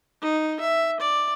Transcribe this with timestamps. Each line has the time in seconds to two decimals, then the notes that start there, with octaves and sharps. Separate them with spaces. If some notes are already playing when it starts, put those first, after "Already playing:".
0.22 D#4
0.60 E5
1.00 D5